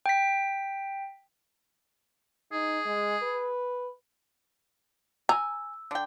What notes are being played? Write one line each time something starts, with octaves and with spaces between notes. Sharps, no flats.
G5 B6
D#4 G#4
G#3
B4
G#5 A#5 E6
D3 G5